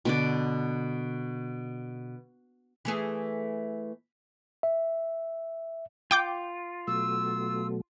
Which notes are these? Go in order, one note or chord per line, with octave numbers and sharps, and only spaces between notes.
B2 D3 D5
E3 A3 G#4
E5
F4 G5 D6 G6
B2 F#3 A3 E6